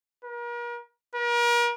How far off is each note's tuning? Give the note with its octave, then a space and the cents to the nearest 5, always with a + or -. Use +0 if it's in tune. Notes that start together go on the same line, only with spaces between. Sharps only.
A#4 +40
A#4 +40